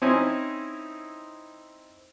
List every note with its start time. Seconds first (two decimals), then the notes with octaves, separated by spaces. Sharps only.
0.02 C4 C#4 D#4 E4 C5 G#5